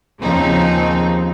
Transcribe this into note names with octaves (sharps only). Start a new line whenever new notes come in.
D#2 C#3 F3 C4 D#4